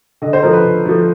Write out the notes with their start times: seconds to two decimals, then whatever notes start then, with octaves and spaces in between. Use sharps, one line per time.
0.22 D3 D#5
0.33 C5
0.39 A4
0.43 F3 A3 A#4
0.53 B4
0.64 D3
0.86 F3 A3